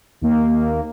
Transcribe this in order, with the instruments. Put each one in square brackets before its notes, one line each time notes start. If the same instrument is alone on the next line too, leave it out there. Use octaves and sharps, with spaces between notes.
[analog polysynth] D#2 A#3